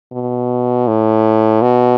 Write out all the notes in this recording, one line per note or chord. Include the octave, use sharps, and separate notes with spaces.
B2
A2
B2